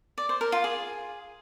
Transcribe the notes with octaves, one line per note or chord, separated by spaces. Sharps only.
D5
C5
A#4
F4
G#4